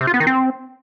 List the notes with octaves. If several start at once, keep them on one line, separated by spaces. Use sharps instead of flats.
C3
F4
B3
D#3
C4